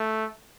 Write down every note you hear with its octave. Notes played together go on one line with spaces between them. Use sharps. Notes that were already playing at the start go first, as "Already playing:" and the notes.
Already playing: A3